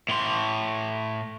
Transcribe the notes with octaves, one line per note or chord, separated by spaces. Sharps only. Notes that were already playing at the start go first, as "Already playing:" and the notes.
A2 C6